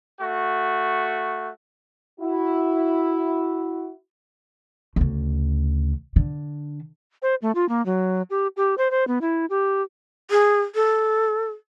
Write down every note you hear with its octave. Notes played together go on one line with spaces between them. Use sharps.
A3 F#4
E4 F#4
D2 C#3
D3
C5
A3
F4
A#3
F#3
G4
G4
C5
C5
B3
E4
G4
G#4
A4